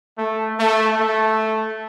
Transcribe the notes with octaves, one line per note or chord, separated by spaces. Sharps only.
A3
A3
A3